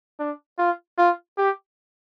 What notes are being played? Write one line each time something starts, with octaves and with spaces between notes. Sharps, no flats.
D4
F4
F4
G4